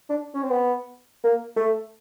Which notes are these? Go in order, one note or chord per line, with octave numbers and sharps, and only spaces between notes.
D4
C#4
C4
B3
A#3
A3